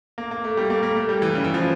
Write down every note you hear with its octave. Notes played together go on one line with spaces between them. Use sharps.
A#3
A#3
A3
G3
A3
A#3
A#3
A3
G3
E3
C#3
E3
F3